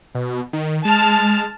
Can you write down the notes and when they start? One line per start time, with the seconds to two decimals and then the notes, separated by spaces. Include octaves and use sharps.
0.15 B2
0.53 D#3
0.85 G#3 A5 F6